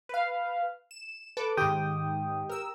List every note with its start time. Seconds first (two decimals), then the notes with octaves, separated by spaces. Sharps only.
0.09 B4 F5
0.91 E7
1.37 A4 B4 D6
1.57 G#2 D#3 G4 G5 D#6
2.49 A#4 E6